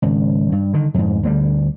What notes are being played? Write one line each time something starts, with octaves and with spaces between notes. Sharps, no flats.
G#1 C#2
G2
D3 D#3
F2 G#2
D2 D3 F#3 G3